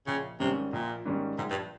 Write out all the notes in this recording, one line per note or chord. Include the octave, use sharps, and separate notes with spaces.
A#1 C#3
G#2 C3 D#3 G3 C#4
A#1 A#2
G#2 D#3 G3 C#4
A#1 G#2
G2